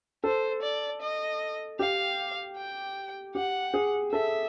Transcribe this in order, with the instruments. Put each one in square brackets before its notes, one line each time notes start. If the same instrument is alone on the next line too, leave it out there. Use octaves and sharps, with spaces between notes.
[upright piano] A4 [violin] C5
[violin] D5
D#5
[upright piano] G4 [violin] F5
[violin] G5
[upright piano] G4 [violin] F#5
[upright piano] G#4
[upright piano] A4 [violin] E5